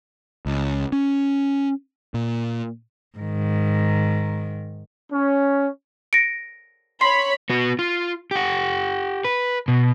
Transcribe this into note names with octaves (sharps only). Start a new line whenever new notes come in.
C#2
C#4
A#2
G#2 D#3
C#4
A#6 C#7 D7
C#5 B5 C6 C7
B3 F#4
F4
G4 F#5
B4
B2